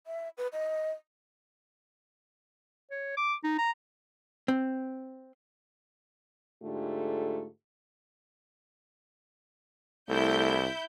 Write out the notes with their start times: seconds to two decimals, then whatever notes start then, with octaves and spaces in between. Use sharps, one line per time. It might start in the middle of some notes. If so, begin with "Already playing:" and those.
0.06 E5
0.37 B4
0.52 D#5
2.91 C#5
3.17 D6
3.44 D#4
3.59 A#5
4.48 C4
6.63 G#2 D3 A3 F4 G4
10.09 C2 A3 E4 G6